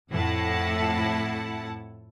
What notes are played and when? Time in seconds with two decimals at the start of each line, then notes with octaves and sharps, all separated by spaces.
0.11 F2 A2 E4 F#5 A5